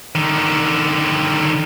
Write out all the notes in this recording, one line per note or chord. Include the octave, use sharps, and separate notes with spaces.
D3 D#3